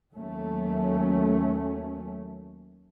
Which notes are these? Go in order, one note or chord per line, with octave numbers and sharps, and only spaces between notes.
D#2 F#3 A3 C#4